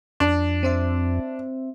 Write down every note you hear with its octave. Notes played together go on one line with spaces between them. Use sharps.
F2 D4
C4 C5 E5